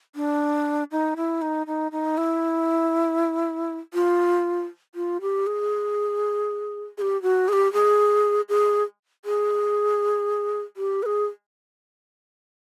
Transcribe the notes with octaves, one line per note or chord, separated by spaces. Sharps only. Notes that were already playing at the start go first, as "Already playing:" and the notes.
D4
D#4
E4
D#4
D#4
D#4
E4
F4
F4
G4
G#4
G#4
G4
F#4
G#4
G4
G#4
G#4
G#4
G4
B4
G#4